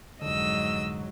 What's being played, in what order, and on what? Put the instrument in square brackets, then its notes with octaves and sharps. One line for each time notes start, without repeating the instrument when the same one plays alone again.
[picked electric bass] F1 D3 [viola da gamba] G#2 F#3 [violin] D#5 E6